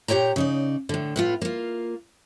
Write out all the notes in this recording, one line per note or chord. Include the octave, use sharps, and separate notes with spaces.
A#2 G4 C#5 G5 A#5
C#3 D#4 D5
A2 D3
A2 B3 F4
A#3 F4